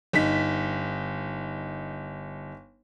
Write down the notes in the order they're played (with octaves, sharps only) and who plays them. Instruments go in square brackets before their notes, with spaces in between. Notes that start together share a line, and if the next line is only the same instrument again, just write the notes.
[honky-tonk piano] G1 D#4 B6